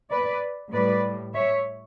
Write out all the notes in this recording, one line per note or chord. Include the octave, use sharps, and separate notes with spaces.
B4 D5
A2 G3 B4 D5
C#5 E5